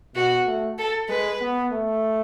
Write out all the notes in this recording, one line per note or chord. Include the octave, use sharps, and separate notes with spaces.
B2 F#4
A3
A4
G#3 B4
B3
A3